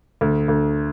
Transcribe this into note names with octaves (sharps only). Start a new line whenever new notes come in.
D2
D2